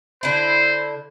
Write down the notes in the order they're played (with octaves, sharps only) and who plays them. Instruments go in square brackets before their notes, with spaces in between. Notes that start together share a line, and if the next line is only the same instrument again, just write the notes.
[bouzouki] D3 E4 [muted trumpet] C5